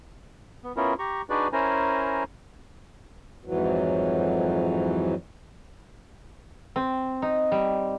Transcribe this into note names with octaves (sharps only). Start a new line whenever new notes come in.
B3
B3 C#4 E4 F4 A#4
G4 A#5 C#6
D4 D#4 F#4 G#4 B4 D5
C#4 E4 A#4 C5 G#5 A#5
F2 G#2 E3 F#3
C4
D#4
G3